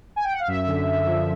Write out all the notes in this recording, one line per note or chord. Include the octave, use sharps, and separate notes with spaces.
G#5
G5
F#5
F5
F#2 E5
D3
F#2
F3